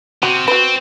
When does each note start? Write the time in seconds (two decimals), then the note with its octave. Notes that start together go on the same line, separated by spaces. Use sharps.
0.23 C3 F#4
0.48 C4 F#4 B4